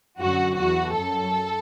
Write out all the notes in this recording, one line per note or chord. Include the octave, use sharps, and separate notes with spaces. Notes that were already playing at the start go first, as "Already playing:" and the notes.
F#2 D3 F#3 F#4
E2 E3 F#4
F#2 F#3 A4